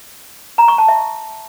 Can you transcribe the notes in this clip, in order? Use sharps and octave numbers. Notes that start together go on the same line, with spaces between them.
A#5
C#6
A5
E5